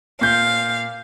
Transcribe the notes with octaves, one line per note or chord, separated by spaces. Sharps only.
A#2 F5 G6